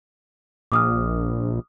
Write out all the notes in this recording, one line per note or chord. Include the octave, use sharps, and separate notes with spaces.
A#1 D6 D#6 F6